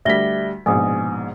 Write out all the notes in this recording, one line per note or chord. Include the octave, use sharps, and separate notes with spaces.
D2 G3 E5 A#6 B6 G7
A#1 G#2 B2 G#5 D#6